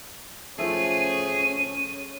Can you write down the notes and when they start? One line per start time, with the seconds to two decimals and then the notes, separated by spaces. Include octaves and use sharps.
0.59 F3 A3 C#4 G#4 D#7